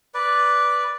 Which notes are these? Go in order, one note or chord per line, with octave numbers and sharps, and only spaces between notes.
B4 D5